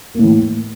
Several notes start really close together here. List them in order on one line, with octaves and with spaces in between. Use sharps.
A#3 A2 E3